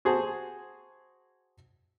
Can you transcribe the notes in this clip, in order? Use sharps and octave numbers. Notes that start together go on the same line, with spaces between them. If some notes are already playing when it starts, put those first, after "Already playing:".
F#4 G#4 C5 A5